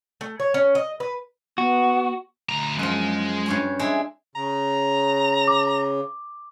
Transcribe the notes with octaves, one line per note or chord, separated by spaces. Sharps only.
A3
C#5
C#4
D#5
B4
B3 F#4
D2 A#5
F#2 F3 G#3
G2 C#4 G#5
G#3 D4 E4
C#3 A#5
D6